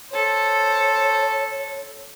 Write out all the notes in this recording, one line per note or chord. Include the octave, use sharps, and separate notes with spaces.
A4 C5 C#5